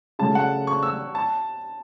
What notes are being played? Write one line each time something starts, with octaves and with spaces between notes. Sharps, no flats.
C#3 F#3 A3 A5
F#5
C#6
E6
A5